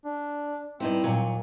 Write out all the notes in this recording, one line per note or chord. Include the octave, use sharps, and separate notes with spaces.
D4
G2 C4 D#4 E4
D#2 A#2 F#3